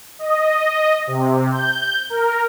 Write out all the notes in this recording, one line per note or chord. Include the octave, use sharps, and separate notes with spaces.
D#5
C3
G6
A#4